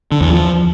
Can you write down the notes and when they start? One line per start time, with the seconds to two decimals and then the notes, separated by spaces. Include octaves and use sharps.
0.12 D3
0.21 E2
0.30 F3